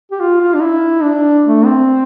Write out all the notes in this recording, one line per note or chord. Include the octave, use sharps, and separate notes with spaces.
G4
F4
F4
D4
E4
D4
A3
C4